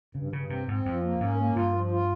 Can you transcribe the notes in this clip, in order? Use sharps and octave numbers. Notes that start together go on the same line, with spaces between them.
G2 C#3
G2 C#3
C3 C4
G#2 C4
F2 F3
A#3
G#2 C#4
A#3
G2 F4
F3
F4